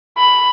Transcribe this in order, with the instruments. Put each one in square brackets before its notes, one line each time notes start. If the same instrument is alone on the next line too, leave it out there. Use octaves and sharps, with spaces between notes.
[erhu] B5